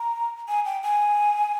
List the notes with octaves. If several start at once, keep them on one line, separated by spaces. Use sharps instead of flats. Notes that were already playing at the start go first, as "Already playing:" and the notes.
Already playing: A#5
G#5
G5
G#5